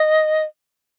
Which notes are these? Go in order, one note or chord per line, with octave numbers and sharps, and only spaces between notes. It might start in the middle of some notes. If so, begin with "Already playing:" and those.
Already playing: D#5